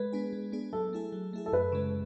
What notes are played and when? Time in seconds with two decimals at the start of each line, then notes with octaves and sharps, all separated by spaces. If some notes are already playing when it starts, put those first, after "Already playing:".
Already playing: G#3 B4
0.12 B3 D4 G#4
0.33 G#3
0.52 B3 D4 G#4
0.73 F#3 A4
0.93 A3 E4 G#4
1.12 F#3
1.33 A3 E4 G#4
1.46 A4
1.52 F#2 B4
1.72 C#3 G#3